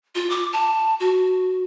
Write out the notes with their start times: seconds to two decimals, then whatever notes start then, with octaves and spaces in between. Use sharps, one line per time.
0.15 F4
0.30 D6
0.53 A5
1.00 F#4